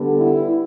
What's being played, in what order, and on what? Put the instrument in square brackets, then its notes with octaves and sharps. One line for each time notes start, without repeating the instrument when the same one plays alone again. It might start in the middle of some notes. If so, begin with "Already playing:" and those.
Already playing: [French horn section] D3 G3 B3
E4